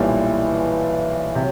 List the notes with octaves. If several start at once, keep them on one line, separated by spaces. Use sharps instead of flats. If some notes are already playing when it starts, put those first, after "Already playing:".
Already playing: B1 A#2 E3 G3
C3 F#3